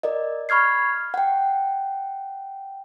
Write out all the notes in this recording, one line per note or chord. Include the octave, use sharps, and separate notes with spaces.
A#4 D5 D#5
B5 C#6 F6 G#6 C7
F#5 G5